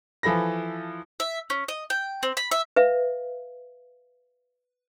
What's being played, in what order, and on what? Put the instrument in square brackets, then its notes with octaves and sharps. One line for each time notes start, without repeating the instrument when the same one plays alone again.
[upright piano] E3 F3 A4 B5 A#6
[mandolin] E5
C#4
D#5
G5
C4
B5
E5
[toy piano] B4 E5 F5